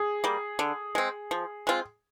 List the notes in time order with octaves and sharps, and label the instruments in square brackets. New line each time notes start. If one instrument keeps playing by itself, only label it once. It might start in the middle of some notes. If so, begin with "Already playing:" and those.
Already playing: [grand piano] G#4
[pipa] G3 A#3
D3
G#3 C4
F3
G#3 C4 F4